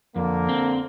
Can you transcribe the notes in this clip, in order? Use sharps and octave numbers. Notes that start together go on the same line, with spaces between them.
F2 D3 A#3
C4